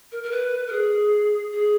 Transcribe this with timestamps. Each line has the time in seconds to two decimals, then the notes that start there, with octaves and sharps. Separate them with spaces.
0.12 A#4
0.23 A#4
0.31 B4
0.67 A#4
0.72 G#4
1.52 G#4